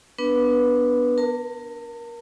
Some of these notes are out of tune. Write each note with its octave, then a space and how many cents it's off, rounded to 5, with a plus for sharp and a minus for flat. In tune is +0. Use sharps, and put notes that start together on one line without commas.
B3 +0 D4 +0 B4 -15
A#4 +20 A5 +45